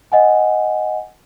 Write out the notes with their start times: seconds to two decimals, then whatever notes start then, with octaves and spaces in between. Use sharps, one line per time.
0.12 D#5 F#5 G#5